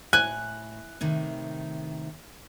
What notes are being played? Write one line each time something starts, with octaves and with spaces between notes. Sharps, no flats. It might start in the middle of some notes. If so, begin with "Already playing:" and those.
A2 G#5 F#6
A2 C3 D#3